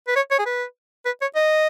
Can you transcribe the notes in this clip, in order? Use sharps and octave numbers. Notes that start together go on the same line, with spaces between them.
B4
C#5
C#5
G#4
B4
B4
C#5
D#5